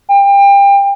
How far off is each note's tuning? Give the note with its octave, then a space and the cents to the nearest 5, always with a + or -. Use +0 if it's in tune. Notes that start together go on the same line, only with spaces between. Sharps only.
G5 +30